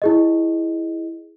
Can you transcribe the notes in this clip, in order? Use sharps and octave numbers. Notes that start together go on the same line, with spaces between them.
E4 G#4 D#5